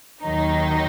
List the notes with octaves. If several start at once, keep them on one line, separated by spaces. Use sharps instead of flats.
D#2 D#3 F#3 D#4